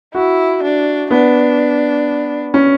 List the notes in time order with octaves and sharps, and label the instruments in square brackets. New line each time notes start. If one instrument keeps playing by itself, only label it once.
[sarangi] E4 [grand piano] F#4
[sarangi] D4
[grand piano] B3 [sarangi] D4
[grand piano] C#4